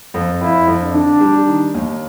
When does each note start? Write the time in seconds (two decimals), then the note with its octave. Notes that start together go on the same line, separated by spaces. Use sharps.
0.14 F2
0.41 F2 E4
0.68 F2
0.80 D4
0.94 D3
1.21 G3
1.47 D#3
1.74 D#2